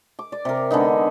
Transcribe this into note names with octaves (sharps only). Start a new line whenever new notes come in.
D6
D5
C3 A#4
D3 G#3 B3 D#4